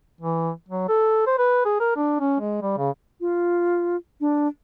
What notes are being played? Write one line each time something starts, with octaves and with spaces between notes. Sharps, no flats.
E3
F#3
A4
C5
B4
G#4
A#4
D4
C#4
G#3
G3
C#3
F4
D4